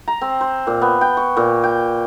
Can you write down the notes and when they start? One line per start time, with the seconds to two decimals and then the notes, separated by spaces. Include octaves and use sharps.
0.08 A#5
0.21 C4
0.41 C5
0.67 A#2
0.82 B3
1.01 G5
1.17 C#6
1.37 A#2
1.64 G5